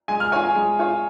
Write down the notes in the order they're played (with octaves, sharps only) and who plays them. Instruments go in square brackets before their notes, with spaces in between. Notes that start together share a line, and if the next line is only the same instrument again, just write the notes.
[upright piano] G#3 [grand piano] G#5
[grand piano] F6
[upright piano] C#5 [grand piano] G#5
[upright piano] F4
[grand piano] G#5
[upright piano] G#3
F4 C#5